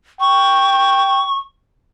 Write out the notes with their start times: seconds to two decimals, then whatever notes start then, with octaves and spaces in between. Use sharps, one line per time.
0.20 G5 C#6